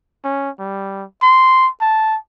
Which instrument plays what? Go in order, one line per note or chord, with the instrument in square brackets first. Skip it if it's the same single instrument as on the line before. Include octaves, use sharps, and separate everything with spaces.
[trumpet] C#4
G3
C6
A5